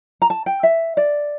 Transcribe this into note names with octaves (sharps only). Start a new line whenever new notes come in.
A#5
A5
G5
E5
D5